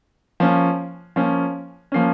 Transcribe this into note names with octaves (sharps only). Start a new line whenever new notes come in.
F3 A#3 C#4
F3 A#3 C#4
F3 A#3 C#4